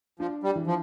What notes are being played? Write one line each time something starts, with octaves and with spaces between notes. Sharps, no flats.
F3 D4
G3
E3
F3